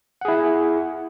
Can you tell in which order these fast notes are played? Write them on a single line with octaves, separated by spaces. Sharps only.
F#5 G#4 E4